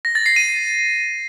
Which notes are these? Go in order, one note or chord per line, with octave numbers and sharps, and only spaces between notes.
A#6
A6
C7
D#7